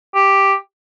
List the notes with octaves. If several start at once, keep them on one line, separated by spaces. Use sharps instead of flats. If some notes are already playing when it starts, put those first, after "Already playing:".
G4